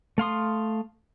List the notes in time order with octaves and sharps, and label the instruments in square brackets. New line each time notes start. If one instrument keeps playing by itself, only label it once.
[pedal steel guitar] A3 F5 C6 D#6